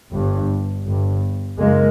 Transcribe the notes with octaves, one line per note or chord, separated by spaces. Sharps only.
G1 G2
G1 G2
F#1 G#3 A#3